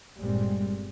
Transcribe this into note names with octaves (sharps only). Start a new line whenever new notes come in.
G1 A#2 G3 G#3 C4